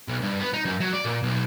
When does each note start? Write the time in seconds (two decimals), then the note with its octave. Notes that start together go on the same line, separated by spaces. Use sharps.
0.08 B1
0.21 G2
0.40 B3
0.53 D#4
0.65 F#2
0.80 F#3
0.93 D5
1.05 A#2
1.23 B1